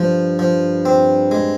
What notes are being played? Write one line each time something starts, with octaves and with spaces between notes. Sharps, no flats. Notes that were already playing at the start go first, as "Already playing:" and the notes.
Already playing: G2 F3
F3
C4
G#3